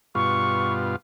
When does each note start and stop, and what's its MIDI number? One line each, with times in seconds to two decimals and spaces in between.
0.15 0.96 43
0.15 0.96 47
0.15 0.96 65
0.15 0.73 85